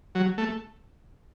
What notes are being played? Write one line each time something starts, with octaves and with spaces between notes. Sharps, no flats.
F#3
A3